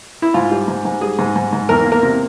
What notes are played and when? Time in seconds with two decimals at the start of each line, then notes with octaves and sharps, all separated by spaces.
0.22 E4
0.34 G#2 F4
0.51 G3
0.68 G#2
0.85 G#2
1.01 G3 G#4
1.19 G#2
1.36 G#2
1.53 G#2
1.69 E2 A#4
1.85 A#3
1.92 A#4
2.03 C3